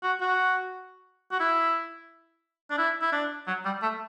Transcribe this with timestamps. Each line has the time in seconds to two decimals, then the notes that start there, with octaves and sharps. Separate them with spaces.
0.03 F#4
0.21 F#4
1.32 F#4
1.40 E4
2.71 D4
2.78 E4
3.02 E4
3.12 D4
3.48 F#3
3.65 G3
3.82 A3